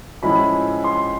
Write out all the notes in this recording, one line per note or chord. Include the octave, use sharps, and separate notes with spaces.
A2 F3 G#3 C#4 E4 B5
C6